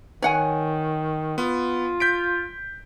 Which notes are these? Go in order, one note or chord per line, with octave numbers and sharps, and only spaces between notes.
D#3 C#5 F#5 G#5
B3 F4
G6 B6 D7